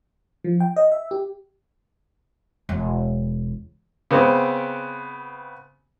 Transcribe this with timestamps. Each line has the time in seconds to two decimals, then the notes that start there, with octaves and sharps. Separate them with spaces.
0.44 F3
0.60 G5
0.76 D#5
0.92 E5
1.11 G4
2.69 E1
4.11 C#3 B3 C4